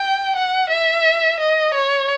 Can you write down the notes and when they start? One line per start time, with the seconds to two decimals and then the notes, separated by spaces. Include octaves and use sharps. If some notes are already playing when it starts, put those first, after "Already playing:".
Already playing: G5
0.36 F#5
0.69 E5
1.40 D#5
1.74 C#5